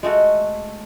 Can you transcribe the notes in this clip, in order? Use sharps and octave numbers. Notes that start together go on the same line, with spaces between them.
G#3 A3 F#4